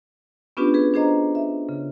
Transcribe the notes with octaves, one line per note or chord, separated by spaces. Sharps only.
B3 C#4 D4 F4 G4 B4
G#4 B4
D4 G#4 C5 D#5 A#5
E5
C#3